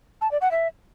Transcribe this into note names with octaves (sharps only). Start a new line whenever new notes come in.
A5
D5
F#5
E5